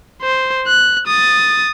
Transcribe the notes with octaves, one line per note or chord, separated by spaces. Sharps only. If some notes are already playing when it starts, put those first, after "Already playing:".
C5
F#6
D#6 A6